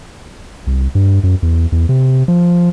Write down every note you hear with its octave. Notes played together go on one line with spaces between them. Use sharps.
C2
G2
F#2
E2
E2
C3
F3